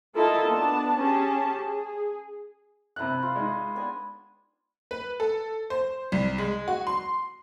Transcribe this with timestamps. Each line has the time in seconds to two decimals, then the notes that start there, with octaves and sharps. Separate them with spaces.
0.17 E4 F4 A4 A#4 D#5 A5
0.49 B3 D4 A5
0.99 C#4 G4 G#4 A5
1.61 G#4
2.96 C3 E4 B4 A#5 F#6
3.22 F4
3.36 G#3 D#4
3.75 B3 D4 G#5
4.91 B4
5.20 A4
5.70 C5
6.12 C2
6.38 G#3
6.68 F#4
6.87 C6